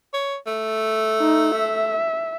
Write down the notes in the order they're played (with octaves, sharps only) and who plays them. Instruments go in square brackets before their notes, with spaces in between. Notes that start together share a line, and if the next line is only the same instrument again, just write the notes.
[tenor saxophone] C#5
A3
[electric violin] D#4
E5